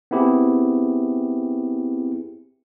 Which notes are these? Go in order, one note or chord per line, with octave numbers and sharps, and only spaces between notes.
B3 C4 E4 G4 G#4